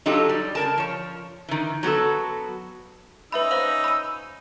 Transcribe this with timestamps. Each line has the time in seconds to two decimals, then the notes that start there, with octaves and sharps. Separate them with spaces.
0.06 F#3 D#4 F4 G4 A4
0.29 G3
0.55 C#3 A#4 A5
0.78 F3 C#5
1.49 D#3 E3
1.83 F#3 B3 F#4 A4
3.32 C#4 D#4 B4 E5 B5 E6
3.51 C5 F5 F#7
3.84 B5 D#7